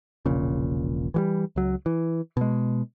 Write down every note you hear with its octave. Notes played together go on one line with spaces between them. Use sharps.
E1 A#1 A#2 C#3
E3 F#3 G3
C#2 F#3
E3
B2 G#3